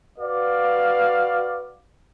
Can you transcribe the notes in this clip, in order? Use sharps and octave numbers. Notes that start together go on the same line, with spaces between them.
F#4 B4 D5 F5